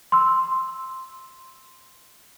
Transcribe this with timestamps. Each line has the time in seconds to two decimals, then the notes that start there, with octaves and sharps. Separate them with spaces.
0.12 C6 E6